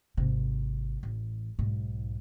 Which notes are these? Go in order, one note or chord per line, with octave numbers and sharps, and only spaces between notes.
G#1 C3
A1
B1 G#2